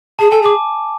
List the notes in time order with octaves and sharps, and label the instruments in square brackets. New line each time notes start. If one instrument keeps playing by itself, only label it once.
[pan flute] G#4 [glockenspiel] A5
[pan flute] A4 [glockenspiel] G#5
[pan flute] G#4 [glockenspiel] D6